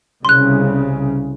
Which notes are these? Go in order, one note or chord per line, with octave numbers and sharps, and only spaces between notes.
C2 C#3 C6 F#6